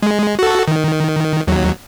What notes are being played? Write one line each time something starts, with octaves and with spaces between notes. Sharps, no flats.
G#3
F#4 A4
D#3
D#2 F#3